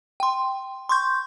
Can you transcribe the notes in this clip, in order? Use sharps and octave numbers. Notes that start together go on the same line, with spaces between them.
G5 C6
C6 C#6 G6